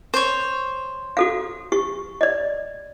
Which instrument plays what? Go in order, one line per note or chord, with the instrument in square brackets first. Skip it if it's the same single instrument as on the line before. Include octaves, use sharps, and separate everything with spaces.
[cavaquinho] C5 C#5
[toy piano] F#4 A4 F5
G4 C#6
D5 D#5